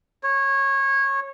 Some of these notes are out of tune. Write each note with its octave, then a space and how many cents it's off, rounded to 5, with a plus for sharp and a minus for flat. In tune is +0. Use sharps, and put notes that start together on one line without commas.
C#5 -20